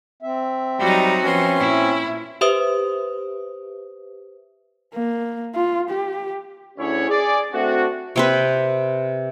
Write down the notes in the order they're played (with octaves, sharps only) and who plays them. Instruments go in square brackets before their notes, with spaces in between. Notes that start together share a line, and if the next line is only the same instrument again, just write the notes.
[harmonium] C4 E5
[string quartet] F#3 D#4 [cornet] G3 [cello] F#4
[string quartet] F3 B3 C6 [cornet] C#4
[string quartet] A#2 [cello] E4
[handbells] G4 B4 C5 E5 D#6
[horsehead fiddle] A#3
F4
G4
[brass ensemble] D2 C#4 E4 G#4 C#5
G#4 D5
A3 C4 D4 F#4
[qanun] C3 C4 B4